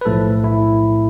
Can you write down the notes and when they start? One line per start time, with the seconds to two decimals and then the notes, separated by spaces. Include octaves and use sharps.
0.01 B4
0.05 B1 A2 F3 A3 A4
0.44 E4